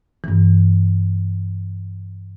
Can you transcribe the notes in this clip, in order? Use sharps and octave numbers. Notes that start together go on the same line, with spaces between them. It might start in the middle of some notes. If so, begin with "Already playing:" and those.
G2 E3